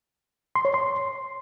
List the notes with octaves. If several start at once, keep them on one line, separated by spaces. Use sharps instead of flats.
C6
C#5
C6